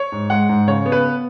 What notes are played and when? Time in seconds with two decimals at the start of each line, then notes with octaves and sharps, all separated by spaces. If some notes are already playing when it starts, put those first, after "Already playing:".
Already playing: C#5
0.12 G#2
0.30 G#3 F#5
0.49 G#2
0.68 C#3 C#5
0.86 B3
0.92 B4
1.05 B3